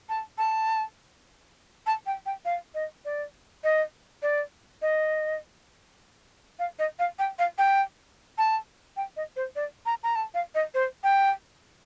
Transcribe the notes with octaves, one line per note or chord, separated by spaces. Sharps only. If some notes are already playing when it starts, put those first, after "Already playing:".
A5
A5
A5
G5
G5
F5
D#5
D5
D#5
D5
D#5
F5
D#5
F5
G5
F5
G5
A5
G5
D#5
C5
D5
A#5
A#5
A5
F5
D#5
C5
G5